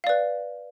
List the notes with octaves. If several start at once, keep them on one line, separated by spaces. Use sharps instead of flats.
B4 D5 F5